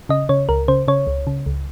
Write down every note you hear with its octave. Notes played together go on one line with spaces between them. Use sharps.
C#3 D#5
C#3 C#5
C#2 A#4
C#3 C5
C#3 C#5
C#2
C#3
C#2